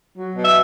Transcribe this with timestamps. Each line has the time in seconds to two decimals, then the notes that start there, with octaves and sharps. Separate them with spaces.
0.16 F#3
0.35 B2
0.43 E5